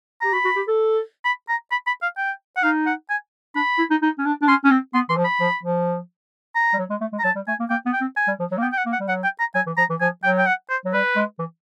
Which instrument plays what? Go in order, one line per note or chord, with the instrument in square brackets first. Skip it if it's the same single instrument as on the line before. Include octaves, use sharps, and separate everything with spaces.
[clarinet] G4 [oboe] A#5
[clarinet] F#4 [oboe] B5
[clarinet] F#4
G4
A4
[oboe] B5
A#5
B5
B5
F5
G5
F#5
[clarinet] D#4 [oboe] F5
[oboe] F#5
G#5
[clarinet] D4 [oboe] B5
[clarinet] E4
D#4
D#4
C#4
D4
D4
[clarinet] C#4 [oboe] C6
[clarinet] C#4
C4
[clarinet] B3 [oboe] C6
[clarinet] E3 [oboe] C6
[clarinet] F3
[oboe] B5
[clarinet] F3
F3
[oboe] A#5
[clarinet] G3
F#3
G#3
A3
G#3
[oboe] A#5
[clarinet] F#3 [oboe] A5
[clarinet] G3
[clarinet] A3 [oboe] G#5
[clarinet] A#3
[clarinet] A#3 [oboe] G5
[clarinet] B3
[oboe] G5
[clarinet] C4
[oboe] G#5
[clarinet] G3
F3
F#3
A#3
[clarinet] B3 [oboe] G5
[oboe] G5
F#5
[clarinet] A#3
[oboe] F#5
[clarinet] G3
[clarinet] F#3 [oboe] F#5
[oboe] G5
A#5
[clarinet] F#3 [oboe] G#5
[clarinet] E3
[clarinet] F3 [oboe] A#5
[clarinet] E3
[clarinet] F3 [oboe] G#5
[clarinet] F#3 [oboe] G5
[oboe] G5
F#5
C5
[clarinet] F#3
[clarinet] G3 [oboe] B4
[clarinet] G#3
E3